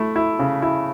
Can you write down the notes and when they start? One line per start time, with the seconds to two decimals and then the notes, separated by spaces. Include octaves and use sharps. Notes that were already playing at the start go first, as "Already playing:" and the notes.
Already playing: A3 E4
0.16 E4
0.39 C#3
0.62 E4